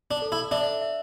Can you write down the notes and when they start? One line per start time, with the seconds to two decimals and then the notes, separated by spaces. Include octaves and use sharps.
0.11 D4
0.22 A4
0.32 E4
0.51 D4 E5
0.82 E5